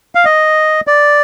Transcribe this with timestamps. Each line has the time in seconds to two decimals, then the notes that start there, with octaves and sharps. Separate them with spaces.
0.15 F5
0.25 D#5
0.87 D5